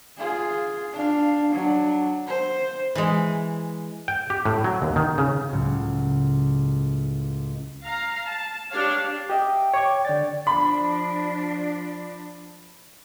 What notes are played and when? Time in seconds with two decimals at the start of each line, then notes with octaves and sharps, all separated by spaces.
0.17 F4 G#4
0.93 D4 F5
1.52 F#3 D4
2.26 C5
2.95 E3 G#3
4.08 G5
4.30 G4
4.45 A2
4.64 F#3
4.82 D#2
4.96 D#3
5.18 C#3
5.52 C#2 A2 F#3
7.84 F5 A#5
8.27 A5
8.71 D4 G4 C#5 F5
9.30 G4 D#5 E5 G5
9.74 C#5 D6 G#6
10.05 D3 D5 G5 A6
10.47 F3 D4 B5